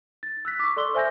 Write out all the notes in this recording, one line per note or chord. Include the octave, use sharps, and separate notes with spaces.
A6
E6 F#6 B6
C#6 D6
A4 D5 C6 E6 G7
C5 E5 G#5 C6 G6 A#6